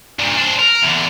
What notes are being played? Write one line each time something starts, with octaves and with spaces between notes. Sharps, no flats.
G2 A#2
D4 C5
A#4
E2 D3